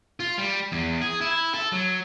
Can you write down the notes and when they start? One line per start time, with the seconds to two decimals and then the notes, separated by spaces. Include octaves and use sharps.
0.20 F4
0.38 G3
0.72 E2
1.01 G#4
1.21 E4
1.54 A4
1.72 F#3